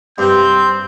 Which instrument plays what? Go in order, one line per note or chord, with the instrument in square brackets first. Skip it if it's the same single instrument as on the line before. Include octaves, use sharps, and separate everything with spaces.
[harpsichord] G2 A#5 [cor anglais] C4 [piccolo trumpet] G6